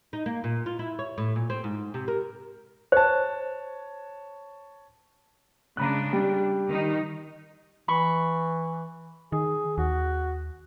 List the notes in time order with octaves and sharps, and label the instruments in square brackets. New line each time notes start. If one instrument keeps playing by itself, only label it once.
[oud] D#4
A#3
A#2
F4
E4
C#5
A2
A#2
C4
G#2
C3
A#4
[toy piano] C5 [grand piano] C#5 A5
[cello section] C#3 G#3 D4 [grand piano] A#5 B5 F#6
[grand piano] G3
[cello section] D#3 D#4
[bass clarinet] E3 [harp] B5 C#6
[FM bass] D#3 [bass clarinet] G#4
[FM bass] D#2 [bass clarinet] F#4